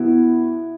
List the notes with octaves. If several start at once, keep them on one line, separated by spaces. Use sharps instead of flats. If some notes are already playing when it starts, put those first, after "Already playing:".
Already playing: B2 B3 E4